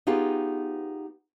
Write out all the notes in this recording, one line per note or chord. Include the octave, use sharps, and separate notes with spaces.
B3 D#4 F4 G4 G#4